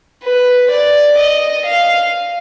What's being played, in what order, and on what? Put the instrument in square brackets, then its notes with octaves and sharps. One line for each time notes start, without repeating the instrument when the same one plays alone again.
[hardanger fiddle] B4
D5
D#5
F5